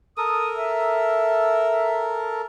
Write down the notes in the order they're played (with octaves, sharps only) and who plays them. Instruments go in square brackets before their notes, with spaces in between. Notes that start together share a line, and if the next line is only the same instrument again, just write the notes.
[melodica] A4 A#4 [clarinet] D#6
[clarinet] E5